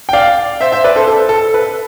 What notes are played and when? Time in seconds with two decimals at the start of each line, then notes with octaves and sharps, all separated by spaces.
0.09 G5
0.13 D5 F5
0.61 C5 E5
0.72 C5 E5
0.84 B4 D5
0.96 A4 C5
1.07 A4
1.29 A4
1.54 B4